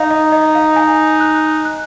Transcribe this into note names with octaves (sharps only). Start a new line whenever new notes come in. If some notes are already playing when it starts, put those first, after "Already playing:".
Already playing: D#4 F5
D#5
D#5
F5
G#5
F#6
F#6